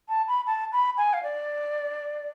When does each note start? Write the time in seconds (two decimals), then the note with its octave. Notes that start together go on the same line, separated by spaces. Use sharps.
0.09 A5
0.28 B5
0.47 A5
0.73 B5
0.97 G#5
1.13 F5
1.23 D5